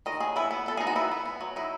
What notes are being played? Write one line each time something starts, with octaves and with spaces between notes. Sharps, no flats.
D#3 D#5
F#3 G#4
B3 E4
B3
B3 A4
D#4 G#4
F#4
B3 E4
B3
B3
F#3
D#4 E4